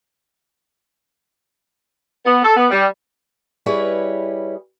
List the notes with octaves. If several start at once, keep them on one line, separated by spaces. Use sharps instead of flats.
B3
A4
B3
G3
G3 E4 G#4 B4 C#5 D#5